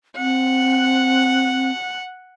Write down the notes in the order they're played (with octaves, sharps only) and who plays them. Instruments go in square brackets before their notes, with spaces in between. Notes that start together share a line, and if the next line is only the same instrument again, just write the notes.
[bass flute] C4 [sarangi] F#5